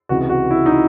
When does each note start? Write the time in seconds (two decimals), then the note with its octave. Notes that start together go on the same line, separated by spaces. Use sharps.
0.09 C#2 C3 E3 F#4
0.29 F#4
0.50 E4
0.66 D#4
0.71 E4